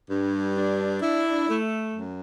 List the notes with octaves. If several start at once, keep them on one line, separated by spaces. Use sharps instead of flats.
G2
D4
E4
A3
F#2